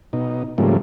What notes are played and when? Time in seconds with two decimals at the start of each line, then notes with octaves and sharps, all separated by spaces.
0.13 B2 D#4
0.58 G#2 C#3 F3 G3 A3 A#3